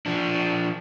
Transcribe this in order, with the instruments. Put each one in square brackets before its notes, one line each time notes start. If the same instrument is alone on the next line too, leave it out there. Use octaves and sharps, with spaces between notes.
[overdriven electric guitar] F3 D4